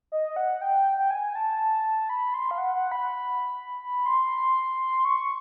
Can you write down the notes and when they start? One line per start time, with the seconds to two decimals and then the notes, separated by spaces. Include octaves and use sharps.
0.12 D#5
0.36 F#5
0.62 G5
0.98 G5
1.11 G#5
1.35 A5
2.09 B5
2.34 C6
2.51 F5
2.58 F#5
2.75 F#5
2.91 B5
4.06 C6
5.05 C#6